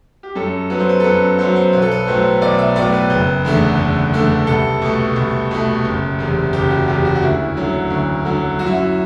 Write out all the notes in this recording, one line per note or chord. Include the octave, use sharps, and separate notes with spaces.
G4
F#2 A4
F#3 B3 B4
C5
B4
A4
F#2 B4
F#3 B3 C5
C5
B1 B4
A4
B4
A2 F#3 B3 C5
B1 D5
E5
A2 F#3 B3 D5
B4
F#1 B4
E2 D3 A3
F#1
E2 D3 A3
C2 A4
B2 A3
C2
B2 A3
F#1
E2 C3
F#1 G4
F#4
E2 C3 G4
F#4
F#4
D2 E4
D3 F#3
D2
D3 F#3
F#2 F#4
E4
F#4